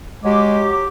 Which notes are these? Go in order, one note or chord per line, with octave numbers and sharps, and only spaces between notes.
F#3 G#3 G4 D6